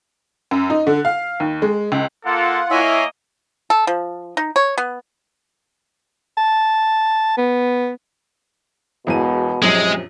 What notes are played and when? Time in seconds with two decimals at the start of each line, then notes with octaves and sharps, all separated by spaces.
0.51 F#2
0.70 D#4
0.87 D3
1.05 F5
1.40 D#2
1.62 G#3
1.92 C#2
2.26 A#3 F4 A4 F#5
2.71 A#3 E4 C#5 D#5 E5 G#5
3.70 A4
3.87 F3
4.37 D#4
4.56 C#5
4.78 B3
6.37 A5
7.37 B3
9.07 E1 E2 B2 D#7
9.62 A#1 F#2 C3 G#3